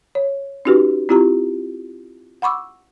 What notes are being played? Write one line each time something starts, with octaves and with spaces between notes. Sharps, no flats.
C#5
C#4 D#4 F#4 G4 B4
C4 E4 F4 G4 A#5
F#5 B5 C#6 D6 E6